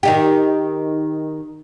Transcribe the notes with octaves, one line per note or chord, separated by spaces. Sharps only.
D#3 D#4 G4